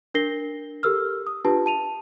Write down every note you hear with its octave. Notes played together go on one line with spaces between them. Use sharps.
D4 A#4 A#6 C7 G7
G4 A4 A#4 E6 F6
D#6
D4 F4 G4 B4 A5
A5 D#7 F7